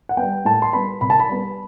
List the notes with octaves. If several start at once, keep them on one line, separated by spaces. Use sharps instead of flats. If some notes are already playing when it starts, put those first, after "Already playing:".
F#5
G3 B3 G5
A2 A5
C6
G3 B3 B5
C3 B5
A5
B5
G3 B3